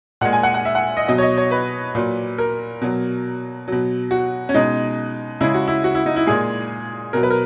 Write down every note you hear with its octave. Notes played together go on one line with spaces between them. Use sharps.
A#2 G#3 F#5
G#5
F#5
F#5
E5
F#5
D#5
B2 F#3 D#5
C#5
D#5
C#5
B4
A#2 F#3
A#4
B2 F#3
B2 F#3
F#4
C#4
B2 G#3 D#4
C#3 G#3 E4
F#4
E4
F#4
E4
D#4
E4
A#2 G#3 G#4
B2 F#3 A#4
B4
A#4